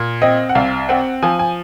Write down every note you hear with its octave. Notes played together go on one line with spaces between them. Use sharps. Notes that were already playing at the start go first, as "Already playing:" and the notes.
Already playing: A#2
C4 D#5
F#5
C2 F5
C4 F#5
F3 G#5
G#5